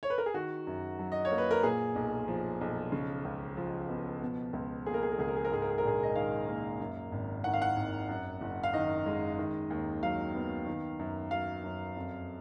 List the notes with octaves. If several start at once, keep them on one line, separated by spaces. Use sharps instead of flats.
C#5
B4
A#4
G#4
D#3 F#4
F#2
F#3
D#5
C#5
A#3
B4
A#4
A#2 G#4
B1
F3
B1
C#3
C#2
F3
B3
B2
C#2
A#3 G#4
A#4
G#4
A#4
C#2 G#4
A#4
G#4
A#4
G#2 G#4
A#4
G#4
A#4
A#1 G#4
D#5
D#3 F5
A#3
F#2
G#1
D#3 F#5
F5
F#5
G#1
F#2
F#1
F5
D#3 D#5
G#3
D#3
D#2
F#3 F5
B3
D#3
F#2
F#3 F5
F#2
F2